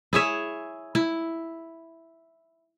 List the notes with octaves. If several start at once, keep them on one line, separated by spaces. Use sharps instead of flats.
E4 G#4 C#5 E5
E4